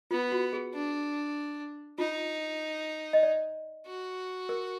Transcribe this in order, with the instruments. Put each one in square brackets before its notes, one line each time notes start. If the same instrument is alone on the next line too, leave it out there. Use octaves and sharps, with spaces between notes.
[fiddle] B3 [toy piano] F4
[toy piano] F#4
G#4
[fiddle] D4
[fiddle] D#4 [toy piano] F4
[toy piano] D#5
D5
[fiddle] F#4
[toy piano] A#4